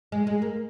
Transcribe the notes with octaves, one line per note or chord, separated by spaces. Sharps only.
G#3
G#3
A#3